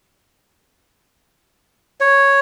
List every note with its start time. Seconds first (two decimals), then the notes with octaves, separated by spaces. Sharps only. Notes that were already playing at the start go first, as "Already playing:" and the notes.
2.00 C#5